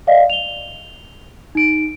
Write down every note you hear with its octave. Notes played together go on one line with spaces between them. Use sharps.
D5 D#5 F5
F7 G7
D#4 D7